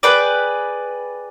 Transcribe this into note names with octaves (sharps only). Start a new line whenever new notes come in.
G#4 B4 D5 G5